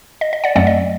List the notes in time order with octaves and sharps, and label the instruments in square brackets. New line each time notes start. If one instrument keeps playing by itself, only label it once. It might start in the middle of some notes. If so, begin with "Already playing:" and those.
[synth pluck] D#5
D#5
D5 F#5
F#2 F#3 A3 C4 D5 F#5
D#5